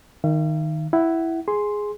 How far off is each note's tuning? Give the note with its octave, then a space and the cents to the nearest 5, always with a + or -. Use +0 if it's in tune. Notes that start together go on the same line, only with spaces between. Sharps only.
D#3 +0 F5 -45
E4 +0 F#5 +20
G#4 +0 C6 +0